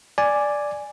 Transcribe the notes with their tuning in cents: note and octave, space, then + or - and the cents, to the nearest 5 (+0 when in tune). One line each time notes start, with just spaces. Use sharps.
D5 +0 G#5 +0